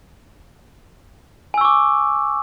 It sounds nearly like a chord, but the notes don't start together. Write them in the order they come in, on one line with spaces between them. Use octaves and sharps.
G#5 E6 C#6 D6